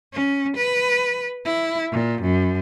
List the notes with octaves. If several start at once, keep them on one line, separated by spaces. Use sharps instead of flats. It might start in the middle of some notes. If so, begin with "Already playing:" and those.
C#4
B4
E4
A#2
F#2